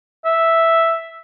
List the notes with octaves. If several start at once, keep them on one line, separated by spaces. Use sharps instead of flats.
E5